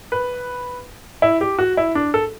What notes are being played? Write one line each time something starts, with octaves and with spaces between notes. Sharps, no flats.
B4
E4
G4
F#4
E4
D4
A4